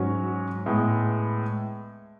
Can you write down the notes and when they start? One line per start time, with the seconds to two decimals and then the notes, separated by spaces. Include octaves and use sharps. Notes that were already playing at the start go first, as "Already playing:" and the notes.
Already playing: G#2 F#3 C#4 F#4
0.66 A2 G#3 B3